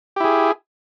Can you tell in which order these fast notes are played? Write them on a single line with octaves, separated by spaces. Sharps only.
G4 E4 G#4